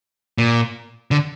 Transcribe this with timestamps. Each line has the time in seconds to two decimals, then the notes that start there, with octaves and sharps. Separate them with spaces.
0.38 A#2
1.11 D3